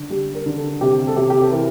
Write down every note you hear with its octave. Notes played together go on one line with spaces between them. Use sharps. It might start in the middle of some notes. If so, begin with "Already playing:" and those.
Already playing: D3
G3 G4
A#4
D3
A4
C3 G4
A4
C3 G4
G4
A4
E3 A#4